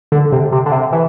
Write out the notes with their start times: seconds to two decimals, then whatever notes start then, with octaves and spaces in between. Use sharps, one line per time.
0.12 D3
0.32 C3
0.52 C3
0.66 D3
0.72 C3
0.93 E3